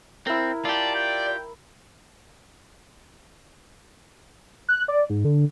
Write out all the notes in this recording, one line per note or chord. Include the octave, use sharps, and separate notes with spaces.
C4 E4 A#4
F4 G4 D5 A5
G5
F#6
D5
G#2
D3